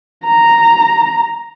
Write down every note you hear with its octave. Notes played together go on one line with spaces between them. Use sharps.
A#5